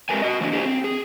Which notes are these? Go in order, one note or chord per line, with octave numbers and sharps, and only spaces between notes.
G#3 C4 G4 A#4 B4 G#5
F#4 D#5
E3 A#3 C4 D4
E4 G4 G#4 C5
C4
G#4